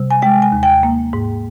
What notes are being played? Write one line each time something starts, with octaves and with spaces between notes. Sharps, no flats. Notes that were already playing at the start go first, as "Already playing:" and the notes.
Already playing: C3 G3
G#5
G#3 G5
G#5
D#2
G5
A#3
G#2